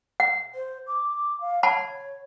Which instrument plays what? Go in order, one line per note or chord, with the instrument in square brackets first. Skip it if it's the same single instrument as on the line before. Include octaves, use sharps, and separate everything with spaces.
[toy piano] F#5
[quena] C5
D6
F5
[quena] C#5 [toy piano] F#5 A5 B5